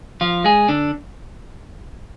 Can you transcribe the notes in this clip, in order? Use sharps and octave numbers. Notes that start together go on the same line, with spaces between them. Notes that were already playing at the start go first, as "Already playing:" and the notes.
F3 F4
G#3 G#4
D3 D4